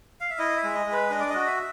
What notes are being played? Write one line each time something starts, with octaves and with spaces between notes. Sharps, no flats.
F5
E5
E4 D#5
E5
G#3
D#5
G#3
B4
D4 D#5
D5
F#4 D#5
E5